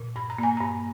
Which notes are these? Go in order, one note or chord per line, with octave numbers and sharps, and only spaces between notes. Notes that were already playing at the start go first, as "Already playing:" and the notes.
Already playing: A#2
G2 B5
A#5
A#3 G#5
G2 A#5